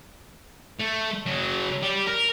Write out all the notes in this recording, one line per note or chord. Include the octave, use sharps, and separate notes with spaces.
A3
C#3 F#3
G4 D5
A#4